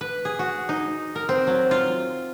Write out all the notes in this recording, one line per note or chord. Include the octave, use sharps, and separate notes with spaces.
B4
G#4
F#4
D#4
A#4
C4
F#3
F4